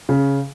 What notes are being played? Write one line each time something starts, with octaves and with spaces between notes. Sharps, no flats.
C#3